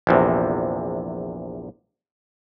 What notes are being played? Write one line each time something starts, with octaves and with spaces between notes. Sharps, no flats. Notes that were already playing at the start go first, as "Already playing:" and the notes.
A#1 E2 C3